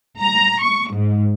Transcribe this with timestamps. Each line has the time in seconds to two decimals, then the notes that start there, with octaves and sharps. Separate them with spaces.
0.21 A#5
0.61 C#6
0.93 G#2